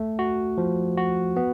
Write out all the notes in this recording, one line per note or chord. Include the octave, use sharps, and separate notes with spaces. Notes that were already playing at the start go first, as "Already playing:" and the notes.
Already playing: A3
F#4
F3
F#4
B3